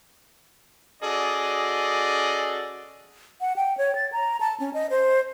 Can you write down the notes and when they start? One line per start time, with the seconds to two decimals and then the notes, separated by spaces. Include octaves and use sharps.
1.02 C#4 F#4 G#4 A4 D5 D#5
3.41 F#5
3.56 G5
3.77 C#5
3.95 A6
4.12 A#5
4.40 A5
4.60 C#4
4.74 D#5
4.90 C5